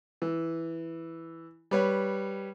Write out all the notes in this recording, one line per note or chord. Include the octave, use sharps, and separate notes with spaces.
E3
G3 B4 C#5